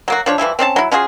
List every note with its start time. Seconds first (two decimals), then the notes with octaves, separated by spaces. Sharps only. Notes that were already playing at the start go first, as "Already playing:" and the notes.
0.08 F#3 A#3 F#4
0.26 F3 D4 C#5
0.38 E3 F3 G3 E4
0.59 C4 C#4 D#4 A5
0.76 F#3 E4
0.92 C#4 F4 F#4 G#4